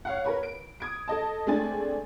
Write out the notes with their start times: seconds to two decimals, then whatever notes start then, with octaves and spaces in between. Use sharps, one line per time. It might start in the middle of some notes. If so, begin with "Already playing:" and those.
0.05 C#5 F5 F#5
0.24 A#4 B4 C#5
0.43 D7
0.80 D#6 G#6 D7
1.08 A4 D#5 A5
1.46 G#3 A3 C4 D4 G#5 A6